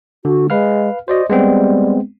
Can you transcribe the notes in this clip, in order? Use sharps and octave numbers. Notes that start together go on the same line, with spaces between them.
D3 F#4
G#3 B4 F5 F6
F#4 C5 D5 D#5
G3 G#3 B3 C4